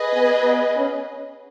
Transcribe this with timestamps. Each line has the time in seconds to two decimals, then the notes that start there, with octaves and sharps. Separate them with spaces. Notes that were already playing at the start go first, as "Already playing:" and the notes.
Already playing: G#4 B4 D#5
0.13 B3
0.44 B3
0.77 C#4